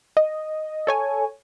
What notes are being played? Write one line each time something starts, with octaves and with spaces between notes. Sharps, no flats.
D#5
A4 C#5 G#5